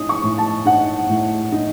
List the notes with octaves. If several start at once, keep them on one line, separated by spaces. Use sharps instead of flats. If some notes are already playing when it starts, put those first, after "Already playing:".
Already playing: A2 D#4 D#6
C#6
A2
A5
D#4 F#5
A2
D#4